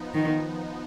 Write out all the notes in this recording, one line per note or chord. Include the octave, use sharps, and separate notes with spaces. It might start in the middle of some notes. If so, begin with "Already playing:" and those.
Already playing: F3 B3 D#4
D#3